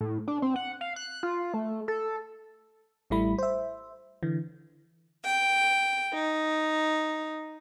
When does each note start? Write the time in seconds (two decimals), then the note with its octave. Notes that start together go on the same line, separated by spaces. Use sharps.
0.01 A2
0.28 D4
0.42 C4
0.56 F#5
0.81 F5
0.96 F#6
1.23 F4
1.54 A3
1.88 A4
3.10 A1 A2 G3 A3 E4 B5
3.38 C5 E5
4.23 D3 E3
5.23 G5
6.13 D#4